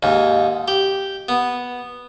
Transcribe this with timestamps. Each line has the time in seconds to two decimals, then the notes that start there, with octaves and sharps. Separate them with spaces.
0.03 D#2 G#2
0.68 G4
1.29 B3